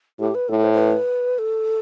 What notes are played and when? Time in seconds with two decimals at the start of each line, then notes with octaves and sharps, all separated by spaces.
0.19 A2 G4
0.35 B4
0.49 A2 A4
0.64 C5
0.74 C5
0.78 B4
1.39 A4